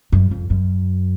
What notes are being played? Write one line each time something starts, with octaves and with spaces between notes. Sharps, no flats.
F#2
F2
F#2